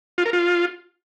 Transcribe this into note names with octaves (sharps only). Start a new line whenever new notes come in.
F4
A#4
F4